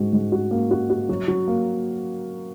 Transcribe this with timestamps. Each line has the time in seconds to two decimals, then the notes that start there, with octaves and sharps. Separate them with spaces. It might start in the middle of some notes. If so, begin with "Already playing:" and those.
Already playing: G#2 F#4
0.13 G#2
0.32 F#4
0.51 A#3
0.71 F#4
0.90 F#4
1.09 F#3
1.28 F#3
1.48 A#3